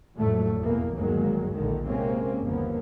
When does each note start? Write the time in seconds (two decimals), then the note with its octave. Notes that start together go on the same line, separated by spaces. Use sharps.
0.17 G#1 F2 A2 D3 F#3 A3
0.61 E2 B2 E3 A#3
0.96 G1 D#2 D#3 F#3 G#3 A#3
1.54 A#1 D3 D#3
1.86 C3 G#3 A#3 C4 C#4
2.43 G1 D#2 F3 A#3 B3